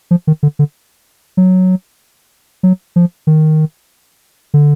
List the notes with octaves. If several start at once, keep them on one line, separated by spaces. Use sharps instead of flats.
F3
D#3
D3
D3
F#3
F#3
F3
D#3
D3